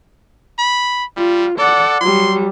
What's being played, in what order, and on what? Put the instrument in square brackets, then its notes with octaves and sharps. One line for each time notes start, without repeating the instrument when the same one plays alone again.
[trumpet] B5
[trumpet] G3 [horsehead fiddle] F4
[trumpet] A4 [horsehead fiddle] D5 F#5
[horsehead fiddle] F#3 G3 [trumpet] C6